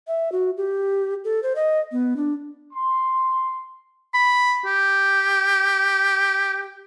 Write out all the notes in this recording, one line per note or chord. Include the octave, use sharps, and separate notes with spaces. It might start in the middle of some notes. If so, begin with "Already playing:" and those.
E5
F#4
G4
A4
C5
D#5
B3
D4
C6
B5
G4